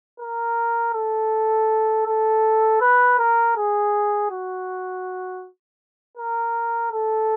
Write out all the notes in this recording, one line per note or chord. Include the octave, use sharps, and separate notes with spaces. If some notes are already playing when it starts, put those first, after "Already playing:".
A#4
A4
A4
B4
A#4
G#4
F#4
A#4
A4